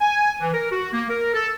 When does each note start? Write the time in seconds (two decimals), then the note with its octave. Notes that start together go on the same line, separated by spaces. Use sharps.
0.01 G#5
0.41 E3
0.53 A#4
0.71 F#4
0.93 A#3
1.09 A#4
1.34 A4